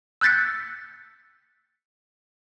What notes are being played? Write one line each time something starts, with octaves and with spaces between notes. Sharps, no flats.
E6 F#6 G6 A6 B6 C#7